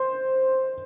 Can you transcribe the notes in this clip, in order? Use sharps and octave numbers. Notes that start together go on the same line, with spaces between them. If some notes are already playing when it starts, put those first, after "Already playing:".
Already playing: C5